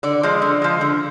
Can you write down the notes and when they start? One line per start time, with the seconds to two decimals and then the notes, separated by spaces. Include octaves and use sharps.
0.03 D3 D5
0.23 F3 G#3
0.42 D3
0.62 F3 G#3
0.81 D3